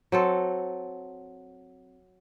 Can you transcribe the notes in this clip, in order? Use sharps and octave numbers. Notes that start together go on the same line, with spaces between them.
F#3 C4 A4